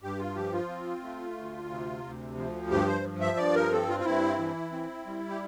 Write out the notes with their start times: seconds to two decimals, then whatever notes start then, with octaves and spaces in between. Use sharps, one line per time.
0.02 G2 G4
0.19 F4
0.36 F3 G4
0.53 F4
0.69 C4
1.03 A3
1.37 D2
1.70 C3
2.04 D2
2.37 F3
2.70 G2 G4
2.87 C5
3.04 F3
3.21 E5
3.37 G2 D5
3.55 A#4
3.71 C4 A4
3.89 F4
4.00 F4
4.04 G2 E4
4.39 E3
4.72 C4
5.06 G3
5.29 G4